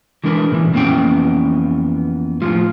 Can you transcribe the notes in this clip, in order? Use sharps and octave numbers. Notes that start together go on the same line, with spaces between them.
E3 G#3 D4 A#4 B4
A#2 E3
F2 E3 A#3 B3 C#4 G5
A2 F3 F4